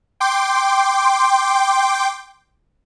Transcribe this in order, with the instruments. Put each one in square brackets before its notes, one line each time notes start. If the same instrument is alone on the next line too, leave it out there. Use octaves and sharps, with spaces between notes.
[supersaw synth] G5 C6 D6